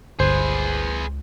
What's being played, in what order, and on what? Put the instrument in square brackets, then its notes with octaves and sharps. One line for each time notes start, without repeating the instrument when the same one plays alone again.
[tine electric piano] G1 [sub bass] C#2 [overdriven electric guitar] G#4 B4 [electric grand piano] C5